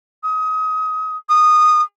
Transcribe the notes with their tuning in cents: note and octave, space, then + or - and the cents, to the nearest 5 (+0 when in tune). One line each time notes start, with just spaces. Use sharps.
D#6 +25
D#6 -15